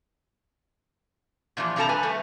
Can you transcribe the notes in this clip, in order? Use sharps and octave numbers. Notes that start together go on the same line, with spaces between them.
A#2 E3 F3 G3
G2 C3 G3 A4 A5 A#5
B4 G#5
G3 A3